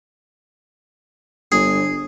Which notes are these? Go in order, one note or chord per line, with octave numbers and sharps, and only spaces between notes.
G1 G#4